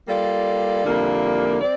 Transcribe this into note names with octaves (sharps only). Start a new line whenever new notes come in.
G3 A#3 F4 A4 D5
F2 D3 G3 A#3 E4
C4 D5